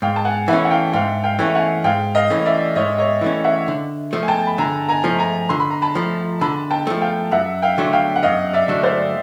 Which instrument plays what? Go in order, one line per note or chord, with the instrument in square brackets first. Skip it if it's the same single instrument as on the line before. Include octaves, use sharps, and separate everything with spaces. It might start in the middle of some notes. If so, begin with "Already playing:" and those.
[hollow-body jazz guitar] G#2 [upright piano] F5 G5
[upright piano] A5
F#5 G#5
[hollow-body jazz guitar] E3 A3 C#4 [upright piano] E5 F#5
[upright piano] F#5
F5 G5
[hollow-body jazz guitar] G#2 [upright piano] F5 G5
[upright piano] F5 G5
[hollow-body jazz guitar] E3 A3 C#4
[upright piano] F#5 G#5
[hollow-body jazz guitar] G#2 [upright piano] F5 G5
[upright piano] D#5 F5
[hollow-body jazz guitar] E3 A3 C#4
[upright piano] D5 E5
[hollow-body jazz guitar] G#2 [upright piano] C#5 D#5
[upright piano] C#5 D#5
[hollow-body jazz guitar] E3 A3 C#4
[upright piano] E5 F#5
[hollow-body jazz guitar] D3
F3 A3
[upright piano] G#5
G5 A5
B5
[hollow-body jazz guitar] D3 [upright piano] G#5 A#5
[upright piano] G#5 A#5
[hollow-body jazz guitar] F3 A3
[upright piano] G#5 A#5
[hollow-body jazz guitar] D3 [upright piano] C6
[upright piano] B5
A#5
A5 B5
[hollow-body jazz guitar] F3 A3
[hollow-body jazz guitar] D3 [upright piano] A5 B5
[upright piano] G5 A5
[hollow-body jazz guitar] F3 A3
[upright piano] F5 G5
[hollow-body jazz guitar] F#2 [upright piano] E5 F#5
[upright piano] F5 G5
[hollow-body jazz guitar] D3 F#3 A3 D4
[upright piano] F5 G5
F#5
[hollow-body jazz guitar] F#2 [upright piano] D#5 F5
[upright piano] D5 E5
[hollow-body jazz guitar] D3 F#3 A3 D4
[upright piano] C5 D5